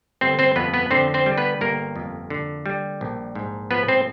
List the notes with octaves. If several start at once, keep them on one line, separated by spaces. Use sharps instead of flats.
G1 C4 C5
C4 C5
F2 B3 B4
B3 B4
D3 C4 C5
C4 C5
G3
B3 B4
G1 A#3 A#4
F2
D3
G3
A#1
G#2
F3 B3 B4
C4 C5